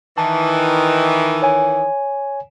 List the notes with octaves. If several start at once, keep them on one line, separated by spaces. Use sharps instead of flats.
D#3 E3 A5
C#5 G#5